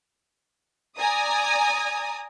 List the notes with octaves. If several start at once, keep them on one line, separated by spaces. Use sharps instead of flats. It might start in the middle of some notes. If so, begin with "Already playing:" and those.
D5 G#5 A#5 D#6